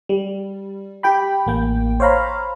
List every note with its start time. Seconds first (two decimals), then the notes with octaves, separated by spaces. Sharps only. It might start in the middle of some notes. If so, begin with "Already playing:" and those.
0.09 G3
1.03 G4 G5 B5
1.46 A1 A#3 G5
2.00 C5 C#5 F5 A#5 B5